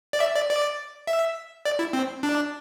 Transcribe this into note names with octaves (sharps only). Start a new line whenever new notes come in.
D5
E5
D5
D5
E5
D5
E4
C4
D4